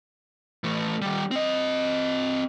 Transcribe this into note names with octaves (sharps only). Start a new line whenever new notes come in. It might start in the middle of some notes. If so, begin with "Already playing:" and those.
E3 A3
D#3 G3
C4 D#5